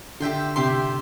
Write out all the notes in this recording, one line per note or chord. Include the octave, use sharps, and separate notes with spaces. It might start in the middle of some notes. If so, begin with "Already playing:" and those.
D3 G4 E5 G5 C6
C3 G4 E5 G5 C6